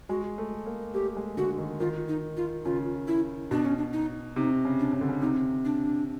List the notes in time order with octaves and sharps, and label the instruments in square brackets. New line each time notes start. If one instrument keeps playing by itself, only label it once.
[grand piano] G#3 [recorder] F#4
[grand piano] A3
A#3
[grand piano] A3 [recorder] G4
[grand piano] G#3
[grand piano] D3 [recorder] F#4
[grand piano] D#3
[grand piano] D#3 [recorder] F4
[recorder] D#4
F4
[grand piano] C#3 [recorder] F4
[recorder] E4
[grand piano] B2 [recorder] D4
[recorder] C#4
D4
D#4
[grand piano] C3 [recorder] D#4
[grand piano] C#3
[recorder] D4
[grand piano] C#3
D3
C#3
[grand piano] C3 [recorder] D#4
[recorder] D4